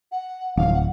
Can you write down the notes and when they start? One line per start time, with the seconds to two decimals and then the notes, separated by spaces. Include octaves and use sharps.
0.12 F#5
0.57 D1 F5
0.74 F#5